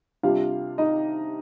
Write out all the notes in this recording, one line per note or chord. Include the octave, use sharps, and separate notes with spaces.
C3 G3 D4 F4 F5
D#4 D#5